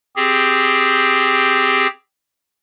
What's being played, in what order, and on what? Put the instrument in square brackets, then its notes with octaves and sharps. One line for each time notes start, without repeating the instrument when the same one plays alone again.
[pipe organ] C4 G4 G#4